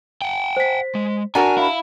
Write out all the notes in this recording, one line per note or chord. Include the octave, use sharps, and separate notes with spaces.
F#5 G5
C5 B6
G#3
D4 F#4 A#4 G#5 A#5
E4 F5 B5